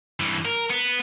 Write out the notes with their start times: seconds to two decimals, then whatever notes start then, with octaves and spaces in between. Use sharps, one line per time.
0.20 G2 E3
0.46 A#4
0.70 B3